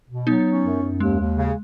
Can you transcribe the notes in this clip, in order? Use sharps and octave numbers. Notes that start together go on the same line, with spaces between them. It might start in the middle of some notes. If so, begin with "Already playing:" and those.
B2
F#3 B3 D#4
C#4
F#2
F#2
D#2 G#3
D#2
C#3